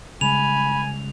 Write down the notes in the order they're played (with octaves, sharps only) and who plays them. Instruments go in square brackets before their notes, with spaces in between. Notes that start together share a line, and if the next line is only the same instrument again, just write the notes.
[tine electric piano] C#3 G3 G#3 [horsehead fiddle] G#5 [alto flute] B5 [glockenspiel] F7